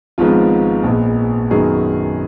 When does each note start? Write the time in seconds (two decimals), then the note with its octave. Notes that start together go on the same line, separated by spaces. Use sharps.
0.18 G#1 G#2 F3 G#3 B3 F4
0.84 A#1 A#2 G#3 B3
1.50 F#2 D#3 F#3 B3 G#4